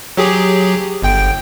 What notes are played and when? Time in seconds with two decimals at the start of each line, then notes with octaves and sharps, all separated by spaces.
0.17 F#3 G4 G#4
1.02 G1 G5